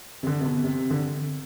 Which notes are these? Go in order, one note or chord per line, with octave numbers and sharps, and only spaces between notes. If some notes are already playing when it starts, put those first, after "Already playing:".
C3
D3
C3
B2
C3
D3